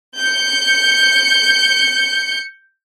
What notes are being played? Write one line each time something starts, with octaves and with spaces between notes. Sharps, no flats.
G6 C#7